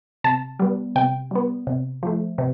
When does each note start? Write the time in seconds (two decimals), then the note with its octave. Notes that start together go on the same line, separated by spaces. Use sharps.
0.24 C3 A5
0.59 G3 B3
0.96 C3 G5
1.31 G3 B3
1.67 C3
2.03 F3 A3
2.38 C3